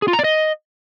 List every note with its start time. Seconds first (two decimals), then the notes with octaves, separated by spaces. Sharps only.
0.02 G#4
0.08 F4
0.13 A#5
0.19 D5
0.24 D#5